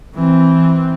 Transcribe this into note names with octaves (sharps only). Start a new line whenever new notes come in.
E3 C4